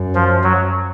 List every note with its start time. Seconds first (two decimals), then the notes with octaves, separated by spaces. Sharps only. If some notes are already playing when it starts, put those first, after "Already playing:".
Already playing: F#2
0.15 F3
0.44 F#3